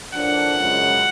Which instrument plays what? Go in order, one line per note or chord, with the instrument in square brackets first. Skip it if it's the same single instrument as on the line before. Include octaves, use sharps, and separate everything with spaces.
[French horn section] A2 F3 A#3 D4 [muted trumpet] F#5
[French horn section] F#2 C#3 F3 G#3 C#4